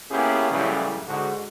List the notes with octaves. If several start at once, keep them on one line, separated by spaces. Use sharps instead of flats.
A#3 B3 C#4 E4 G4 G#4
F#2 A2 C#3 E3 F#3 G3
G#2 D3 F#4